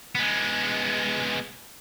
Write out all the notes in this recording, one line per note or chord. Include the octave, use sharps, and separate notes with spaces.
G#3 B3